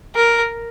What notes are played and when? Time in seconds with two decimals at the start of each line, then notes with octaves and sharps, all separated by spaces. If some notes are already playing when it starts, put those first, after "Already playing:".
0.16 A#4